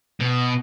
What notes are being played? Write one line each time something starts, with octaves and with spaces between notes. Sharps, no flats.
B2